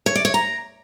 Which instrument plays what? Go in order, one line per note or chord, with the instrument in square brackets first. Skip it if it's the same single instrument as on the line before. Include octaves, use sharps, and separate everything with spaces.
[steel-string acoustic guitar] C#5
D5
C#5
A#5